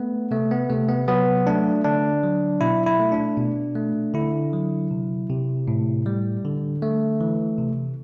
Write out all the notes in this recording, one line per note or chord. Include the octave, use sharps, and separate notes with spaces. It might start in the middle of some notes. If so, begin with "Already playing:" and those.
Already playing: A3 B3
C3 A3
B3
C3 A3
B3
F#3 B3
A3 D4
D3 D4
F#3
B2 E4
E4
A3
D4
B2
A3
D3 E4
F#3
C3
C3
A2
G3
D3
A3
E3
C3